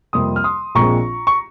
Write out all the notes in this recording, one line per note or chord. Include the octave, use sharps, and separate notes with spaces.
F2 C3 G3 A#3 C6 D#6
F6
C6 D#6
A#1 A#2 G#3 C4 A#5 C#6
C#6